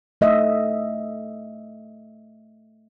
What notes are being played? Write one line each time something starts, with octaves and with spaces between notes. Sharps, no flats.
A3 D#5 E5